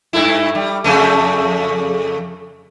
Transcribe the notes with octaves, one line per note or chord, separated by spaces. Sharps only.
G2 A3 E4
G3
F2 C#3 A3